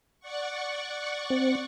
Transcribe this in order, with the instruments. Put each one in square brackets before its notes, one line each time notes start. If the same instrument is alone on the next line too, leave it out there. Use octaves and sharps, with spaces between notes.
[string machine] D5 F#5 C#6
[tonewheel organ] C4